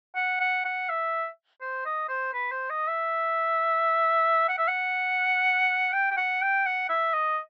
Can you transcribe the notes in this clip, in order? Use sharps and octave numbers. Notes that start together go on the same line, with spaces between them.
F#5
F#5
F#5
E5
C5
D#5
C5
B4
C5
D#5
E5
F#5
E5
F#5
G5
G5
F#5
G5
F#5
E5
D#5